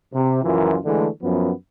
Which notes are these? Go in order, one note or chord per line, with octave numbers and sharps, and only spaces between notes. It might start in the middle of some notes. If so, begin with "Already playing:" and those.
C3
C#2 F#2 E3 F3 F4 A#4
D3 E3 G#3 A3
F#2 F3 B3